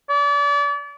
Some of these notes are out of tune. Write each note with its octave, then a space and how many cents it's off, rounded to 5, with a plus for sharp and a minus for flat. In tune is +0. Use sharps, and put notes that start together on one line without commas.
D5 -35